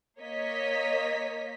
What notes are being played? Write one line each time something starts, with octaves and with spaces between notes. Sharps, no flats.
A#3 C#5 D#5 B6